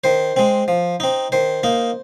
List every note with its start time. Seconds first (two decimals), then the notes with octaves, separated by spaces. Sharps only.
0.04 D#3 C5
0.36 G#3 C4
0.68 F3
1.00 C4 D#4
1.32 D#3 C5
1.63 A#3 D#4